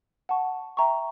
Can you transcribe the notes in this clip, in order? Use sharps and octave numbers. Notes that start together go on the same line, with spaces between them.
F#5 A5 C#6
E5 G5 A#5 C#6